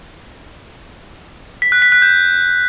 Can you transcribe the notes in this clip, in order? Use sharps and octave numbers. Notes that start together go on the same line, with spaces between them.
B6
F#6
B6
F#6
G6